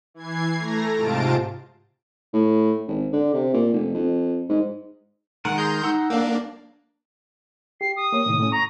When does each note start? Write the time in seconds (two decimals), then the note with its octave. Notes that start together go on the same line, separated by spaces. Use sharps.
0.14 E3 G#6 C7
0.57 A3 A#5 A#6
0.94 G#2 C3 F4 A5 D7
2.33 A2
2.88 G#1
3.13 D3
3.34 C3
3.54 A#2
3.74 F1
3.95 F2
4.49 G#2
5.45 D#3 G#3 A#4 F#5
5.58 G#4 A#5 C6 G6
5.84 D#4 F#5 E6
6.10 A#3 D4 F5
7.81 G4 C7
7.96 D#6
8.13 A#3 C#5
8.26 A2 C3 D#3
8.40 A2 C#4
8.52 A#5 C#6